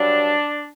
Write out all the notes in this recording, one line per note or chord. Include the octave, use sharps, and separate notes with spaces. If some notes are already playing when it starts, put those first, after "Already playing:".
Already playing: G2 F#3 D4